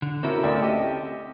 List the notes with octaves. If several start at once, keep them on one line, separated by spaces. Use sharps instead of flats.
D3
A#3 C4 C#4 E4 F#4 A4
D2 D5 E5
G4 D#5